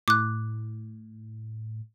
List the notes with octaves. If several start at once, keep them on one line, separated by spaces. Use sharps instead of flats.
A2 D6 F#6